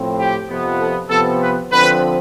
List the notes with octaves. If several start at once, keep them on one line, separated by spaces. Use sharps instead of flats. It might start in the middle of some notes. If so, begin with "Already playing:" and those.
Already playing: A2 F3 C4
G4
F2 C3 F3 B3
A4
C3 F3 B3 A4
B4
D3 F3 C4 B4